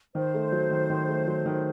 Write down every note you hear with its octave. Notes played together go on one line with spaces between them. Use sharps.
D#3 C5
A3
F#3
D#3
D#3
A3
F#3
D#3